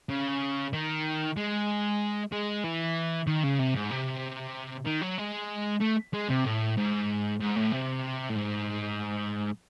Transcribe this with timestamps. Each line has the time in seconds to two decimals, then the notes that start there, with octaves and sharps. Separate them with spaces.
0.10 C#3
0.73 D#3
1.37 G#3
2.32 G#3
2.64 E3
3.27 D#3
3.43 C#3
3.59 C3
3.75 G#2
3.91 C3
4.86 D#3
5.02 F#3
5.18 G#3
5.81 A3
6.13 G#3
6.29 C3
6.45 A2
6.77 G#2
7.40 G#2
7.56 A2
7.72 C3
8.29 A2
8.35 G#2